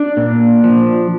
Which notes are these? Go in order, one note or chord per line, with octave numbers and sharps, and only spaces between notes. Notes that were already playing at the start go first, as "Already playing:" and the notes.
Already playing: D4
A#2
F3